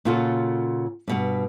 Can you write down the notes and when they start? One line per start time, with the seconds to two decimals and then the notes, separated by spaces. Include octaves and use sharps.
0.05 A#2 C#3 F4 F#4 A4
1.08 G2 B2 B3